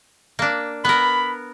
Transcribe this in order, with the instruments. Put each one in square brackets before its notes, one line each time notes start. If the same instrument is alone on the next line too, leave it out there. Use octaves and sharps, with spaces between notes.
[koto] A#3 D4
[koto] B3 A#4 [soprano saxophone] B5